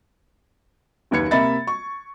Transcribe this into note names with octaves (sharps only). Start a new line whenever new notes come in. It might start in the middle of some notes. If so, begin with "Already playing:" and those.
F#1 D#2 B4 G#6 C#7
C3 A#3 E5 B5 A6
C#6